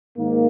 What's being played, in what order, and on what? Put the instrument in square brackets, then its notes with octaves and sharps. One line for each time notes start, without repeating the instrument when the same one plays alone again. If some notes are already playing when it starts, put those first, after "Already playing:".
[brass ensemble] G#2 D#3 A#3